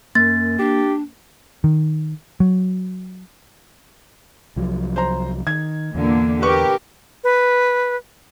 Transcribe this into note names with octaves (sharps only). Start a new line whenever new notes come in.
F#2 A#3 A6
D4 G4
D#3
F#3
C2 F3 F#3
C5 A#5
D#3 G#6
E2 A#2 D3 A#3
G4 A#4 B4 C#6
B4